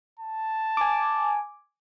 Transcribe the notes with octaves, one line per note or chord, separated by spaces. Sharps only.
A5
G#5 D6